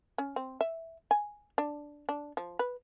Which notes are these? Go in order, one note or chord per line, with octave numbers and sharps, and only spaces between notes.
C#4
C4
E5
G#5
D4
D4
F3
B4